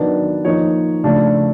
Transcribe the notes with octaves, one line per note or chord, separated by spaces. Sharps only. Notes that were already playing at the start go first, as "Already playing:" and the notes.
Already playing: D#3 F#3 B3 D4 B4
F3 A#3 D#4 C#5
C#3 F3 A3 D4